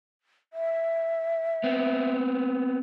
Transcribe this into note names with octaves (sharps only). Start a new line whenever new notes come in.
E5
B3 C4